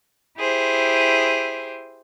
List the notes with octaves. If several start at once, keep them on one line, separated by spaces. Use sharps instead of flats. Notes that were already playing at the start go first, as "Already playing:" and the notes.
E4 G4 G#4 C5